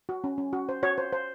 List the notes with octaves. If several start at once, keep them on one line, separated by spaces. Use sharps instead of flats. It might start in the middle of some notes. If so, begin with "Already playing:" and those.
F#4
C#4
C#4
F#4
C5
F#4 C#5
C5
C5